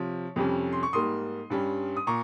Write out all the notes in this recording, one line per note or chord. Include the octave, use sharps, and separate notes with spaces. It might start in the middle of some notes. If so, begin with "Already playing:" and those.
Already playing: C3 F3 C#5
F2 C3 G3 C#4
C6
C#6
G#2 G3 A#3 C6 D#6
G2 G3 C#4
D#6
A#2 A#5 C#6